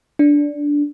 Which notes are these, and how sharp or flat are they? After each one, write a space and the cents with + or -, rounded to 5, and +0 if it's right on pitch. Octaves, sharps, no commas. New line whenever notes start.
D4 -10